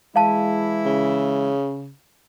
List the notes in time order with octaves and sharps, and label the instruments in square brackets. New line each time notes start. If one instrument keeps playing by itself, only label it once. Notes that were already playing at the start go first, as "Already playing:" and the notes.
[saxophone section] E3 E4 [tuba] G#3 [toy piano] F5 A5
[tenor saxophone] C#3